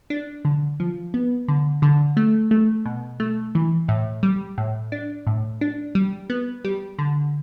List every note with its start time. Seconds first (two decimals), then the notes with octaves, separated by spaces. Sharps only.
0.10 D4
0.45 D3
0.80 F3
1.14 B3
1.48 D3
1.82 D3
2.17 A3
2.51 A3
2.86 B2
3.20 A3
3.55 E3
3.88 A2
4.23 G3
4.58 A2
4.92 D4
5.27 A2
5.61 D4
5.95 G3
6.30 B3
6.65 G3
6.99 D3